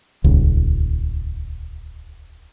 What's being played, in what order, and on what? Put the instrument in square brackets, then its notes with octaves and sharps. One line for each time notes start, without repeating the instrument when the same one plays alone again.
[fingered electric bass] D#1 C#2